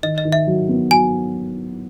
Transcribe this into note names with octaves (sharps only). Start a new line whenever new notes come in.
D#3 D#5
D#5
D#3
E5
F#3
B3
F#3 G#5